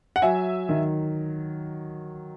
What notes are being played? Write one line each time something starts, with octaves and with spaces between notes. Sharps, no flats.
F#5
F#3 E5 G#5
D#3